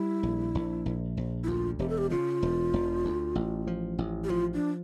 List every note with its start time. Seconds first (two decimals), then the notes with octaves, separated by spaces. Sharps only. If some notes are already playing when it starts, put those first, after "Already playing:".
Already playing: G3 E4
0.23 A#1
0.55 A#1
0.86 A#1
1.17 A#1
1.44 E4
1.48 D2 F4
1.79 E1 G4
1.89 A4
1.98 G4
2.10 C#3 F4
2.43 E1
2.73 E1
3.05 D2
3.35 A1
3.67 F3
3.98 A1
4.24 G4
4.30 F3 F4
4.54 D4